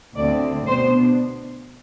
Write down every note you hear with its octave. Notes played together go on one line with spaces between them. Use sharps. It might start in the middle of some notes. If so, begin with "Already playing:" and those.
D2 D3 A3 C4 D5
B2 B3 D4 C5